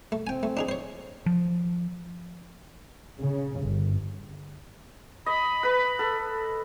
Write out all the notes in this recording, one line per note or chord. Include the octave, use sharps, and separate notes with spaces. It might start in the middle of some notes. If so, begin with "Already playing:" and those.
A3
C4 G5 G#5
A3
D4 D#4 G#4
C5 C#5
F3
C#3
G1
D#5 B5
B4
A4